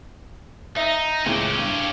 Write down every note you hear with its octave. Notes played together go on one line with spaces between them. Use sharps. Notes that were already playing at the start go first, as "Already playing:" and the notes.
D#4 D#5 E5
C#2 A2 C#4 G4
G2